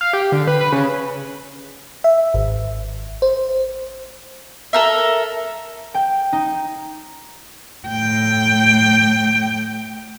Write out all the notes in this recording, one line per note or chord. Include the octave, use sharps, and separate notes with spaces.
F5
G4
D3
B4
B4
C#3
E5
G#1
C5
A4 A#4 E5
G5
D#4
A2 G5